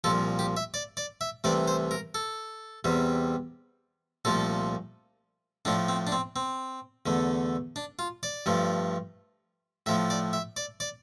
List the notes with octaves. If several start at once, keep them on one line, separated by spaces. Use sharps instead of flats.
C2 A#2 F3 A4
G4
E5
D5
D5
E5
C2 C3 E3 A3 D5
C5
A#4
A4
E2 C3 G3
C2 A#2 F3 A3 A4
A2 F3 A3 D4
C4
D4
C4
C4
E2 D3 A3
D4
F4
D5
G2 F3 A3
A2 F3 A3 E5
D5
E5
D5
D5